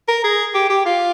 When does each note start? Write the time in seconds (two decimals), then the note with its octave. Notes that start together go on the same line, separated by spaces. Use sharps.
0.08 A#4
0.24 G#4
0.54 G4
0.70 G4
0.86 F4